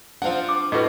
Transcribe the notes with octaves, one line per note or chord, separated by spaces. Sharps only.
F3 C4 D4 F5 F#5
D6
A2 A3 F#4 B4 D#5